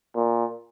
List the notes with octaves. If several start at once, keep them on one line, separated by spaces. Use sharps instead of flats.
A#2